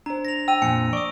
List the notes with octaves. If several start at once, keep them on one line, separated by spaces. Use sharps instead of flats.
D4 C5 A#5
A#6 F7
G5 E6 D#7 F7
F2 A#2 G#5 C#7
D5 C#6 D#6